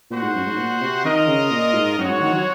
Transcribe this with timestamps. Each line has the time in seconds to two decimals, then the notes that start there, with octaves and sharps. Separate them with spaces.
0.10 A#2 F#4 C5 F#5
0.23 G#2
0.34 F#2
0.46 G#2
0.58 A#2
0.81 C3
1.05 D#3 F4 A#4 D#5
1.27 C#3
1.51 A#2
1.74 G#2
1.97 F#2 C4 F#4 C#5 F#5
2.09 G#2
2.21 D#3
2.33 F#3